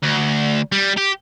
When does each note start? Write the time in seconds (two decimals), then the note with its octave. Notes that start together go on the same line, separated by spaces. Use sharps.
0.03 D2
0.72 G3
0.98 G4